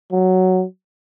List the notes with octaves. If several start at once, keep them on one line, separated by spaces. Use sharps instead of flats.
F#3